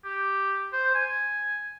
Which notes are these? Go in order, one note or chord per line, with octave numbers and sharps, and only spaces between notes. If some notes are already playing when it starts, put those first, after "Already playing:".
G4
C5
G#5